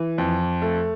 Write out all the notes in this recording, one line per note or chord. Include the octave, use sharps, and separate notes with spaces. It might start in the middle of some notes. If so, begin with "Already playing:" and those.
Already playing: E3
F2
A3